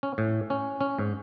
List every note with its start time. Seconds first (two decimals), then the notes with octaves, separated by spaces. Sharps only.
0.03 C#4
0.18 A2
0.50 C#4
0.81 C#4
0.99 G#2